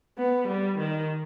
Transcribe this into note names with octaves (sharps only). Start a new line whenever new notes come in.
B3
G3
D#3